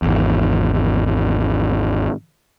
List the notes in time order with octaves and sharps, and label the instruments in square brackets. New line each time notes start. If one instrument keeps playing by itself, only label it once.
[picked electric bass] G#1 E2